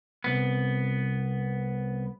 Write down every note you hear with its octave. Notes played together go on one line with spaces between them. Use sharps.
C2 B3